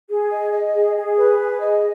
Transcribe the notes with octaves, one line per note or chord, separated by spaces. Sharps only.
G#4
D#5
D#5
G#4
G#4
B4
G#4
D#5